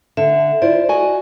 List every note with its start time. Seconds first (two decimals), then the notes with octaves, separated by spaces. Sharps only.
0.17 D3 E5
0.62 E4 F4 C5 D5
0.89 F#4 D#5 G#5